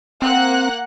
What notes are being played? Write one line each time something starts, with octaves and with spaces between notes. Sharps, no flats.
A#3 C4 F#5 F#6